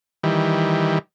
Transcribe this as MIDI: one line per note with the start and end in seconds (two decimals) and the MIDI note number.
0.23 0.99 51
0.23 0.99 52
0.23 0.99 55